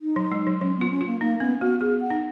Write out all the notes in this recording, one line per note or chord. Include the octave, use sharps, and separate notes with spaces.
D#4
F#3
G#3
F#3
F#3 C#4
B3 F4
C#4
F4
A#3
A#3 D#4
B3 C#4
B3 F#4
B3 G#4
F#5
D#4